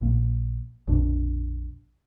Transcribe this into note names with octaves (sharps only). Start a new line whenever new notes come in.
A#1 A#2 A#3
A#1 F2 B2 D4